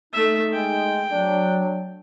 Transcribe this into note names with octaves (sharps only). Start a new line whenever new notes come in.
A3 D#4 E5
G#3 G5
F#3 D4